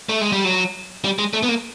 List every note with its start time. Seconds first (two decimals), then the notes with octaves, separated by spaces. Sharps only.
0.09 A3
0.21 G#3
0.32 G3
0.44 F#3
1.05 G3
1.19 G#3
1.33 A3
1.43 B3
1.49 A#3